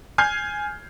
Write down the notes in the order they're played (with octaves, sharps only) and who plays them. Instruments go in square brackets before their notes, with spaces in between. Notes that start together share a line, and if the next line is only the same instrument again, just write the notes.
[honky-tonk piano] G#5 F6 G6 G#6 C7